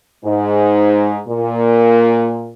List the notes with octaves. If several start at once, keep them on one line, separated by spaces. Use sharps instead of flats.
G#2
A#2